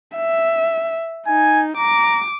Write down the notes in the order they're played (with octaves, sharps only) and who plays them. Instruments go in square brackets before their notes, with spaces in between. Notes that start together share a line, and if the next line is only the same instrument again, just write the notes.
[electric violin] E5
[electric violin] D#4 [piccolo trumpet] G#5
[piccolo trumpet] A#5 [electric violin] D6